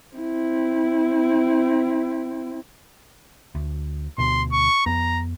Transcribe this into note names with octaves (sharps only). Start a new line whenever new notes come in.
C4 E4
D2
D2 B2 C6
C#6
F2 B3 A#5